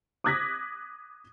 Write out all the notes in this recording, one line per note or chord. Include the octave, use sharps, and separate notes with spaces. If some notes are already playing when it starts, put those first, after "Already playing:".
D6 D#6 F#6 G#6 A#6 B6